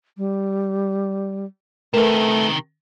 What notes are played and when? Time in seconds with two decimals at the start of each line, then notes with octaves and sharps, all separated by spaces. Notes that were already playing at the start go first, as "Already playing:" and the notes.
0.18 G3
1.94 C3 D#3 A3 A#4 B4